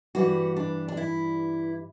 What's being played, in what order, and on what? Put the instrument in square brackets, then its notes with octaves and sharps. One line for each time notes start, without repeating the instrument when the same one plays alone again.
[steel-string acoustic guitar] G2 E3 G3 F#4
D4
D4
E4